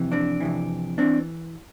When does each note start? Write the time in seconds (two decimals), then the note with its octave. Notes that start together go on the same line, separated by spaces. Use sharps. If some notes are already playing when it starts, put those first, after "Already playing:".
Already playing: F2 C3 E3
0.12 C4 D4
0.40 F2 C3 E3
0.98 E3 C4 D4